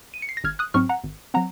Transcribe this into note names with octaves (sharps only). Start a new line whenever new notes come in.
D#7
C#7
C7
A#6
G#1 F6 G#6
D#6 F#6
G#2 F#3 C4 C#6 F6
F#5 A#5
G#1
F#3 C4 F#5 A#5